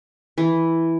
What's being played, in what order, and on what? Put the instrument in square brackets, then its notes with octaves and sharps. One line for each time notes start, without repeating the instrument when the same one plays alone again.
[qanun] E3